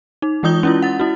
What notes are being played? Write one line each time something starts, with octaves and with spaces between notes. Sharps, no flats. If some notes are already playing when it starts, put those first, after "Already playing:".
D#4
E3 G#3 F4 D#6 G6 G7
C#4 E4 F4
F#5 A6
E4 F#4